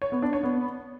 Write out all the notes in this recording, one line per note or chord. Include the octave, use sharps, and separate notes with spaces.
C#5
B3
D4
C#5
B3